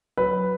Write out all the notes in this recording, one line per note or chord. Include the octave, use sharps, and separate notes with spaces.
F#3 B4